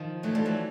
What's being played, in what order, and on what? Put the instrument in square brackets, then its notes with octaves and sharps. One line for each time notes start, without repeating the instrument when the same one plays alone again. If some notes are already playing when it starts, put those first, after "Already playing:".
Already playing: [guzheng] D#3 F3
[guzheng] E3 F#3 [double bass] A3
[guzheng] F3 G3
E3 F#3